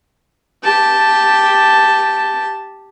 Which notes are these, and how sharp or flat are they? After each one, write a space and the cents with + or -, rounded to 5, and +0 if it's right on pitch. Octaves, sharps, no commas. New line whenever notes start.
G4 +0 A5 +0